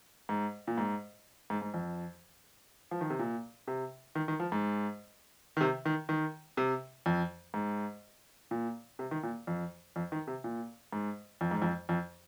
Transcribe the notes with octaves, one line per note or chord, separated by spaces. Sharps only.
G#2
A#2
G#2
G#2
G#2
F2
F3
D#3
C3
A#2
C3
D#3
D#3
F3
G#2
D#3
C3
D#3
D#3
C3
F2
G#2
A#2
C3
D#3
A#2
F2
F2
D#3
C3
A#2
G#2
F2
G#2
F2
F2